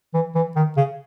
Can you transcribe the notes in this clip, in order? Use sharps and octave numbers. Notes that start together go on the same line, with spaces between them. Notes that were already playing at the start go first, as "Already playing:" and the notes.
E3
E3
D#3
C#3